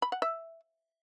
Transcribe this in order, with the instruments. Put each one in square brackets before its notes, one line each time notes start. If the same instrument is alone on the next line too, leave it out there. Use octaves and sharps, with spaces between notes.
[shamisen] B5
F#5
E5